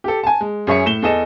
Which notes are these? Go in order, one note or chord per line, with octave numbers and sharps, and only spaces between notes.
G4 A4
G#5 A5
G#3
F#2 G#4 C#5 E5 G#5 C#7
A2 E7 G7
E2 G#4 A4 D#5 E7